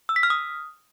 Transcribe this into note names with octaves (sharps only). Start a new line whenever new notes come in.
E6
B6
F6
D#6